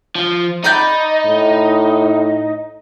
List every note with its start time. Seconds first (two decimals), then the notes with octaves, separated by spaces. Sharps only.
0.15 F3
0.64 D#4 D5 B5 G6
1.26 A2